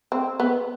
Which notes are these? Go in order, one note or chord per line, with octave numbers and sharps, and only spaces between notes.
C4
B3